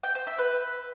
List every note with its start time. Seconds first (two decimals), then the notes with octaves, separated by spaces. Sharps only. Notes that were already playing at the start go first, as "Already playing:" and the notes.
0.03 G5
0.15 C5
0.27 E5
0.38 B4